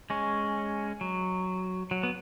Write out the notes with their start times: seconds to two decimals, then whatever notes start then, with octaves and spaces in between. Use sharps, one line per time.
0.10 G#3 C#4
1.01 F#3
1.91 F#3
2.03 B3